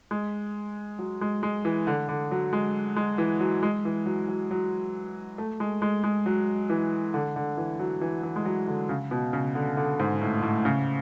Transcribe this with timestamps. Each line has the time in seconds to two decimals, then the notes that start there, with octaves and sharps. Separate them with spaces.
0.11 G#3
0.99 F#3
1.21 G#3
1.43 G#3
1.65 E3
1.87 D3
2.09 D3
2.31 F#3
2.53 G#3
2.96 G#3
3.18 E3
3.40 F#3
3.63 G#3
3.85 E3
4.06 F#3
4.28 F#3
4.51 F#3
5.38 A3
5.60 G#3
5.82 G#3
6.04 G#3
6.26 F#3
6.70 E3
7.14 D3
7.36 D3
7.57 E3
7.79 F#3
8.01 E3
8.23 E3
8.36 G#3
8.45 F#3
8.67 D3
8.89 C#3
9.11 B2
9.33 C#3
9.55 D3
9.77 D3
9.99 G#2
10.22 A2
10.42 A2
10.65 C#3